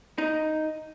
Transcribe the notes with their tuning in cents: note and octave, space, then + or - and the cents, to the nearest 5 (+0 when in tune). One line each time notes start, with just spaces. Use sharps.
D#4 +0